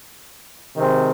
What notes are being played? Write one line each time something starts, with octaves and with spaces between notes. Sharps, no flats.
C3 D#3 G#3 C4